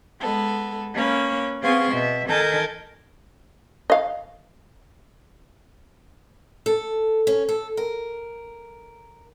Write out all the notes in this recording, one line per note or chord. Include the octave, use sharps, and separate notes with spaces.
G#3 B3 A4
A#3 C#4 B4 C#5
B3 C4 G#4 F5 C6 C#6
B2 E5
D#3 A4 A#4 G#5 A5 G6
D#5 F5
A4
C#4
A4
A#4